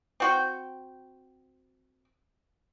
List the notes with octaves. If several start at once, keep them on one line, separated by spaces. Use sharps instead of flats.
C4 F#4 G5